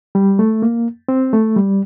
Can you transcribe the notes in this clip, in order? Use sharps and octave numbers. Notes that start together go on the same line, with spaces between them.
G3
A3
A#3
C4
A3
G3